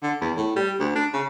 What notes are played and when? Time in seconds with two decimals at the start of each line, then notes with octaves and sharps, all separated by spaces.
0.02 D3
0.21 E2
0.37 A2
0.56 G3
0.79 D2
0.95 D4
1.13 C#3